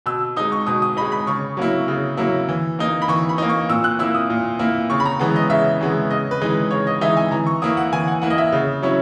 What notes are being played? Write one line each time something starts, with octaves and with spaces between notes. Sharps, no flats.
B2 E6
G#3 D#4 D#6
C#6
B2 D#6
D#6
G#3 D#4 B5
B5
C#3 C#6
F#3 A#3 E4
C#3
F#3 A#3 E4
E3
A#3 D#4
B5
E3 C#6
B5
A#3 D#4
C#6
A#2 E6
F#6
A#3 E4 E6
D#6
A#2
A#3 E4
C#3 C#6
B5
A#5
E3 G#3 B3
D#5
C#3 E5
E3 G#3 B3
C#3 D#5
B4
E3 G#3 D#4
B4
C#3 C#5
D#5
E3 G#3 D#4 E5
G#5
E3 A#5
C#6
A#3 E4 D#6
F#5
E3 G#5
F#5
A#3 E4 F#5
D#5
E5
C#3
F#3 C#4 E4